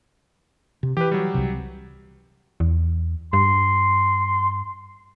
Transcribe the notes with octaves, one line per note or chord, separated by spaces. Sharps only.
C3
E3 G4 B4
F#3 G3
C2 C3
E2
G2 C6